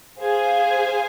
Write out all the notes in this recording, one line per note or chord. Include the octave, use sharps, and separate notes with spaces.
G#4 C5 F5 G#5